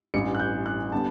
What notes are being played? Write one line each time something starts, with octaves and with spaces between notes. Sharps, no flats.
A1 G2 E3 C#7
F#6
G6
F#6
D3 G3 B3 A5